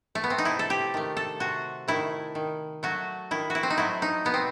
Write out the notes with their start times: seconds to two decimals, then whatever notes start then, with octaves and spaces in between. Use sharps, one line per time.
0.15 A3
0.24 B3
0.30 C4
0.38 D#4
0.45 C3 E4
0.59 A4
0.70 G4
0.94 D#3 A3
1.17 A4
1.40 C3 F#4
1.88 D#3 A3 E4
2.35 D#3
2.83 F#3 A3 F#4
3.31 D#3 E4
3.50 F#4
3.55 E4
3.63 C4
3.70 D#4
3.78 F#3 A3 E4
4.02 D#4
4.25 B2 B3
4.34 C4